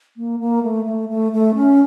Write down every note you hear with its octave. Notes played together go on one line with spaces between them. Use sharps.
A#3
A#3
A3
A3
A3
A3
C#4